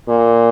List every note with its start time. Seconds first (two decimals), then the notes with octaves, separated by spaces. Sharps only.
0.08 A#2